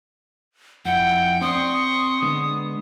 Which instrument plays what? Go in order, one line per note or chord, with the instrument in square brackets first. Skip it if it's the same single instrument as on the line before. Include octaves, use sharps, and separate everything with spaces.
[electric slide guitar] F2 E4 [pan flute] F#5 [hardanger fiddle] G5
[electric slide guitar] C4 D5 G5 [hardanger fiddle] C6 C#6 [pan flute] D#6
[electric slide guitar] D3 G#3 B3